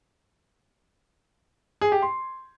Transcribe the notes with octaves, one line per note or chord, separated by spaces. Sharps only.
G#4
G4
C6